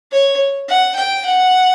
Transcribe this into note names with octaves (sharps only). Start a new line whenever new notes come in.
C#5
F#5
G5
F#5